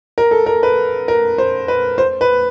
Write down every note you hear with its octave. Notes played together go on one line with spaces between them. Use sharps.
A#4
A4
A#4
B4
A#4
C5
B4
C5
B4